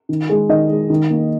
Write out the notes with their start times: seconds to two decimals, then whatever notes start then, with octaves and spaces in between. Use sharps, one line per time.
0.09 D#3
0.30 G#3
0.49 D#3 D#5
0.70 G#3
0.90 D#3
1.10 A#3